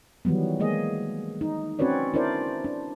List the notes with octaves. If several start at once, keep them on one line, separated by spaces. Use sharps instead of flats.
D#3 E3 F#3 G3 B3
G#3 A#3 G#4 D#5
D#4
C4 C#4 F#4 B4 C#5 D5
D4 E4 A#4 C5 D5
D4